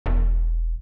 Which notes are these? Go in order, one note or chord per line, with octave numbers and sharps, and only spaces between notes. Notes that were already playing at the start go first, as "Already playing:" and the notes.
E1